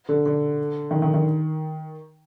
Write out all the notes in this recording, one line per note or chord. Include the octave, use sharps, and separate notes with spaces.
D3
D3
D#3
D#3
D#3